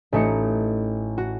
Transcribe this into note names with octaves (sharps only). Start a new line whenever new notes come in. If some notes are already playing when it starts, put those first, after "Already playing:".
A1 A3 D#4 C#7
F#4